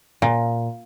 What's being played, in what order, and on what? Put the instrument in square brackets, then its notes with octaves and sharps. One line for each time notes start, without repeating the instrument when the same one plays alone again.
[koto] A#2